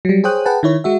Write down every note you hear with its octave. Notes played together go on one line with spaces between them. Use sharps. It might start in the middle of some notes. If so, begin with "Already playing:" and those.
F#3 G3
G#4 C5 C#5 G5 D#6 F#6
G#4 B4 F#5 G5 A5
D#3 E4 C#5
G#3 F#4 E5